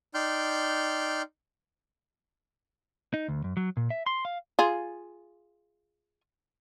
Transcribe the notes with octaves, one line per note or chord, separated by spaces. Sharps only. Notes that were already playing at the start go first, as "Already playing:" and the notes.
D#4 D5 G5 C6 F6 G6
D#4
D2
F#2
F#3
A#2
E5
C6
F5
F4 G#4